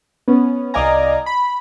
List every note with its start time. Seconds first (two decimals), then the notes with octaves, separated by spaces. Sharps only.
0.28 B3 C#4
0.74 C2 D5 D#5 F5 G#5 A#5
1.26 B5